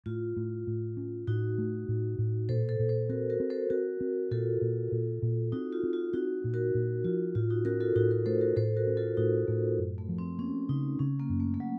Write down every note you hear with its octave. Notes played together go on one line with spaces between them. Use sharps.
A2 F4
A2
A2
C#4
A2 D#4 F#4
A3
A2
A2
A#2 A4 C5
A4 C5
A#2
A4 C5
C4 F#4 A#4
F#4 A#4
C4
A4 C5
C4 F#4 A#4
C4
A#2 F4 A4
A#2
A#2
A#2
C4 D#4 F#4
F4
C4
F4
C4 D#4 F#4
A#2
F#4 A#4
A#2
F3 F4
A2 F4
D#4 F#4
C#4 F#4 A#4
F4 A4
A2 D#4 F#4
F#4 A#4
A3 A4 C5
F#4 A#4
A2 A4 C5
F#4 A#4
C#4
F4 A4
A2 D#4 F#4
A2 A3
F#2
A3
F3
C4
A#3 C#4
C#3 D#4
C#3 C#4
A#3
F#2
A3
A3
F#3